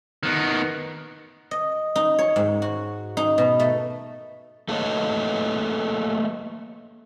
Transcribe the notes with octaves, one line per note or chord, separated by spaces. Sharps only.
D#3 B3
D#5
D#4
C#5
G#2
F#4
D#4
B2
A3
A3 A#3 A4 B4 C#5 D#5